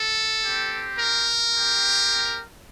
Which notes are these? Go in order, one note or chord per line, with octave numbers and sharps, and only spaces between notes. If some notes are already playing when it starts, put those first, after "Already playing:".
Already playing: A4
C4 G4
A#4
C4 G4